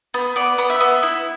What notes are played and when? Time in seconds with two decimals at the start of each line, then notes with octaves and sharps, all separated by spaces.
0.14 B3
0.36 B3 D5
0.58 B3
0.70 E5
0.81 B3
1.03 E4